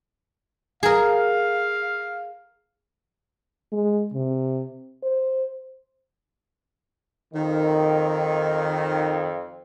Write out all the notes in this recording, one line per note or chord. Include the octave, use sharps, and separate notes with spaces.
G#4 A#4 F5
G#3
C3
C5
F2 D#3